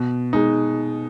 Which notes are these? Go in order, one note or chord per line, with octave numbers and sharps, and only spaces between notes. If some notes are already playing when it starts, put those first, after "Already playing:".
Already playing: B2
G#3 D#4